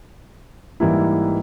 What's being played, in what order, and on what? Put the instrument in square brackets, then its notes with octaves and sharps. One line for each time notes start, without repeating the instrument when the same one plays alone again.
[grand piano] G#2 E3 G3 A#3 E4